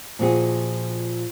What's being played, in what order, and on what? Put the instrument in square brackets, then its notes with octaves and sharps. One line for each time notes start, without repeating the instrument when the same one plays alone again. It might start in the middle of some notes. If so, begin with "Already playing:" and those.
[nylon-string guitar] A#2 F3 F#4 G#4